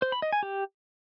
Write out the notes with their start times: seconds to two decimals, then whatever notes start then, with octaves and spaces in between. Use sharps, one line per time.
0.02 C5
0.12 B5
0.22 D#5
0.33 G#5
0.43 G4